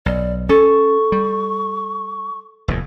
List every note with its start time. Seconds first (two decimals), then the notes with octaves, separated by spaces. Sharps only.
0.06 B1 D5
0.49 C#4 A4 C#6
1.12 G3
2.68 F1 D#2 A2